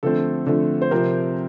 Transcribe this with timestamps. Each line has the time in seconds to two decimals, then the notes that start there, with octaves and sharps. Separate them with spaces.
0.03 D3 F3 A3 C4 A4
0.46 D3 F3 A3 C4
0.82 C5
0.91 C3 F3 C4 A#4